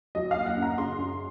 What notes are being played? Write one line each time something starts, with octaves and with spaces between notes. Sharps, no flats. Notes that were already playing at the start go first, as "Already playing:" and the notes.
F#3 D#5
A#3 F5
F#5
F#2
A#5
C#3 C6
F#2